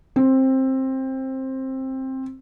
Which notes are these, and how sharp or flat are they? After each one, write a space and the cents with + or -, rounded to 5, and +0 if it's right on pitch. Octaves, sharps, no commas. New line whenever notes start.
C4 +15